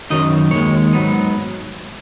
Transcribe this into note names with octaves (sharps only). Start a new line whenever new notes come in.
F#2 D#3 F#3 D#4 D#5
D#2 D#3 G#3 C#5
G#2 F#3 B3 D#4